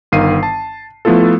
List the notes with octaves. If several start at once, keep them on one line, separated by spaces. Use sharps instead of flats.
G1 D#3 F5 C7 D#7
A5
F3 A3 B3 E4 F4 A4